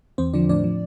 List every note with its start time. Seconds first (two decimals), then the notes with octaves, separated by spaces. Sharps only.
0.18 E2 C4 C5
0.33 D3 F3 D4 D5
0.49 A2 D4 D5
0.64 F3